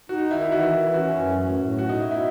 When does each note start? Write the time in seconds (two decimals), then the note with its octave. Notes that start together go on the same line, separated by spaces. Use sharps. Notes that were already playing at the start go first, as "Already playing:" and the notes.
0.09 D#4 F#4
0.30 D#3 E4
0.41 E4
0.52 E3 F#4
0.73 E3
0.94 C#4 F#4
1.15 F#2
1.37 A2
1.58 A2
1.79 B2 F#4
1.89 D#4
2.00 B2 E4
2.11 E4